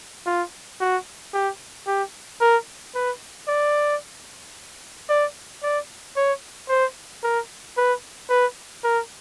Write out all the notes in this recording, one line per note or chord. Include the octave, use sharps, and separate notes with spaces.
F4
F#4
G4
G4
A#4
B4
D5
D5
D5
C#5
C5
A#4
B4
B4
A#4